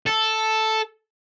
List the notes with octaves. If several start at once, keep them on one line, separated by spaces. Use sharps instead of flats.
A4